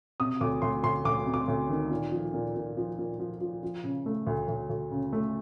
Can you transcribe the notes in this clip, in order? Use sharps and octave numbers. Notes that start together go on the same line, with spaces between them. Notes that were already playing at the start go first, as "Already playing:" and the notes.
C3 D#6
D2 D6
D2 C6
D2 C6
D2 D6
C3
D6
D2
D#3
A#2
F3
A#2
A#2
F3
A#2
F3
F3
F3
C#3
A3
D2
D2
D2
C#3
A3